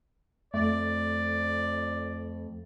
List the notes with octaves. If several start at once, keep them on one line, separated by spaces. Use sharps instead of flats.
F2 A3 D5